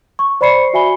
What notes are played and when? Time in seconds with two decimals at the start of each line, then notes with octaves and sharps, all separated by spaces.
0.19 C#6
0.41 C5 D5 B5 C#6 C7 C#7
0.73 F#4 E5 G#5 B5 G7